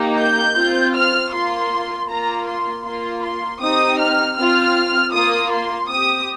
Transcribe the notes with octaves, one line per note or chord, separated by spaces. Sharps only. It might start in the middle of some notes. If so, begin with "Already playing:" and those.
Already playing: A#3 D#4 G4
G6
C4 F4
F6
A#3 F4 C6
A#3 F4 A#5
C6
A#3 F4 C6
C6
C4 D#4 G4 D#6
F6
C4 F4 F6
A#3 F4 D#6
C6
C4 G4 D#6